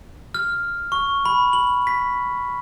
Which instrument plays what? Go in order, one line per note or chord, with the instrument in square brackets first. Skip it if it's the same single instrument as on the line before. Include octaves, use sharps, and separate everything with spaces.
[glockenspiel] F6
C#6
B5
F#7
B6